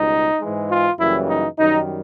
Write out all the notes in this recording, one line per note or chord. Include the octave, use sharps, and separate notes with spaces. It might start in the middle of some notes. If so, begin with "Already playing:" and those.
Already playing: C#2 B2 G3 D#4
G#2 E3 G#3
F4
F#2 C#3 E3 G3 A#3 E4
D#4
F#2 D#3 G3 D#4